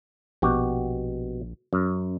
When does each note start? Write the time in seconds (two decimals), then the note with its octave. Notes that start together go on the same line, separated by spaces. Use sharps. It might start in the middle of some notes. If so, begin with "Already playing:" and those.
0.42 A#1 B2 F#4 G4
1.73 F#2